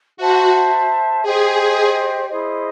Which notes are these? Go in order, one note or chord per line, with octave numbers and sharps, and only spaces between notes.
F#4 C5 E5 A5
G4 G#4 C5 D#5
E4 G#4 C5 D#5